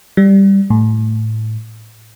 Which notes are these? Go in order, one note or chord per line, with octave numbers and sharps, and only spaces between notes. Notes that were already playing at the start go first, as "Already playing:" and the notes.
G3
A2